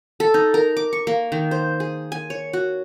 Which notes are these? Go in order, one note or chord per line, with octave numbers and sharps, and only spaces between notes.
A4
D#4
A#4
D6
C#6
A#3
D#3
C5
G#4
G#5
C#5
F#4